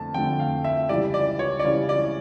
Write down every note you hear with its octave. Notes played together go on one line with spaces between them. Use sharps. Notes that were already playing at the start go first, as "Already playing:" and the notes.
Already playing: F2 D3 A3 A5
F2 D3 A3 G5
F5
E5
C#2 C#3 E3 G3 D5
D5
C#5
D5
C#2 C#3 E3 G3 C#5
D5